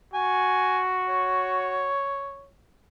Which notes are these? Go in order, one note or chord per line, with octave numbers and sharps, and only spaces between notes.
F#4 G#5
C#5